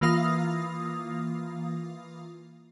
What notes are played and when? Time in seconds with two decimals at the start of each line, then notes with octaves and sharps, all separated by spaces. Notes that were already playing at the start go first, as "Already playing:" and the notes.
0.01 E3 A#3 F4 F5 D#6